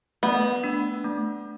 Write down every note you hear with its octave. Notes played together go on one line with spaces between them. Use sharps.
A3 B3
D4
A3